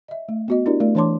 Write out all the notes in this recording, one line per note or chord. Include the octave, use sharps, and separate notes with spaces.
D#5 E5
A3
B3 F#4 D#5
D4 E4 F#4 G4 A#4 D5
A3 A#4 D5
E3 D4 C#5 A5 C6 D6